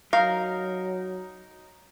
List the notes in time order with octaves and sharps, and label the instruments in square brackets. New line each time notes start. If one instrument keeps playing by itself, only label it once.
[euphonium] F#3 [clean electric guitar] D#4 A#4 [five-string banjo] F5